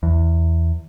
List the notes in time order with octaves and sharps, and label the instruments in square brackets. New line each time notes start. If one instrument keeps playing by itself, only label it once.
[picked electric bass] E2